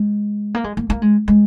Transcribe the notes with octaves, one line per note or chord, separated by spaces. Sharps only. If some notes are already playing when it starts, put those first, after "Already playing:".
Already playing: G#3
A#3
G#3
A#3
A#3
G#3
G#3